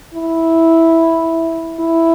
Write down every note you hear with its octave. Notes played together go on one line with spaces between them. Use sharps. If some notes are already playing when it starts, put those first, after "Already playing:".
E4
E4